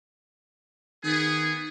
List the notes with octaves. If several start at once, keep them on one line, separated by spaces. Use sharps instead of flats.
D#3 B3 G#4